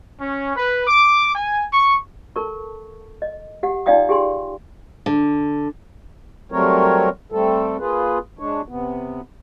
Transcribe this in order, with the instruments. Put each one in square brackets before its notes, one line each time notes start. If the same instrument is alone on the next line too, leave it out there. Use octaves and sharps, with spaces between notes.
[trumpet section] C#4
B4
D6
G#5
C#6
[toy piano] A4 A#4 A5 C#6
D#5
G4 F#5
D#4 F4 D5 F5 G5 D#6
G4 G#4 G5 G#5 C6
[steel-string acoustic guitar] D3
[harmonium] F#3 G3 A3 C4 A#4 C#5
G3 A3 C4 A4
A#3 F4 G#4 B4
G#3 D4 C#5
C3 B3